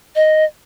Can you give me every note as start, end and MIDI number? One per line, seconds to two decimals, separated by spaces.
0.16 0.45 75